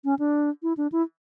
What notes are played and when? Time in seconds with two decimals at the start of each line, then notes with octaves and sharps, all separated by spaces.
0.05 C#4
0.19 D4
0.63 E4
0.77 D4
0.92 E4